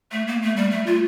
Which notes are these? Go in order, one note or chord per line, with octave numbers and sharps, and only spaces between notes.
A3
A#3
A3
G3
A3
F4